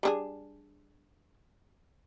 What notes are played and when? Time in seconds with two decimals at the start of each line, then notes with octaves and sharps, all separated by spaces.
0.03 G3 D4 G#4